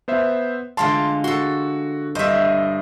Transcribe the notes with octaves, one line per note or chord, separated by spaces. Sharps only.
B3 C5 E5
D3 G#3 F4 A5 C6
F#4 A4 C6
G2 C5 D#5 E5